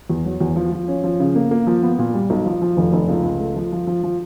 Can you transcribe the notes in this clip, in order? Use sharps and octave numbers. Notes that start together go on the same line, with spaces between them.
E2
F#3
E2
F3
F3
C#4
F3
C#3
A#3
A#3
F3
B3
A#2
G3
B1
F3
F3
F1
F1
C#2
C#2
A3
F3
F3
F3
F3